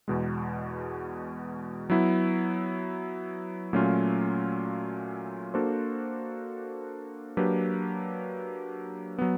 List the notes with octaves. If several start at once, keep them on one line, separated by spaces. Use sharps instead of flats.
E2 B2 G#3
F#3 B3 E4
A#2 F#3 A3 C#4 F4
A#3 D4 F#4 A4 C5
F#3 A#3 D4 G4 B4
F#3 B3